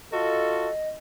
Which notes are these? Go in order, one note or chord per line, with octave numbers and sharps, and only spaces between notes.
F4 F#4 A4 D#5